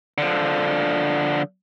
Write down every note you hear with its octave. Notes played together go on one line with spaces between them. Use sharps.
D3 F3